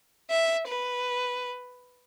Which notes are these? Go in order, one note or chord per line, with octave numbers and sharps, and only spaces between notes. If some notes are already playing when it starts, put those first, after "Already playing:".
E5
B4